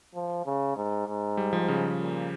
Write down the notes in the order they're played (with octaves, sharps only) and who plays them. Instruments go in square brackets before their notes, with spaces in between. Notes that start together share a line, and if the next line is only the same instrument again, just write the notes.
[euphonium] F3
C#3
G#2
G#2
[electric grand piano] G3
F3
C#3
[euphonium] A#2